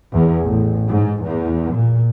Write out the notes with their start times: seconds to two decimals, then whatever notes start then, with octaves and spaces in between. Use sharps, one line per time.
0.13 E2
0.45 A1
0.88 G#2
1.23 E2
1.74 A#2